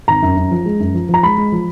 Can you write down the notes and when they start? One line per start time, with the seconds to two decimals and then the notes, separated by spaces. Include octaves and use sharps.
0.08 G#1 A#5
0.22 F#2
0.37 F#2
0.51 F3
0.65 G#3
0.80 F#2
0.94 F3
1.09 F3 A#5
1.23 G#3 B5
1.38 G#3
1.52 F3